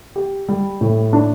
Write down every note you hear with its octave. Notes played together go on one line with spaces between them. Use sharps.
G4
G3
A2
D4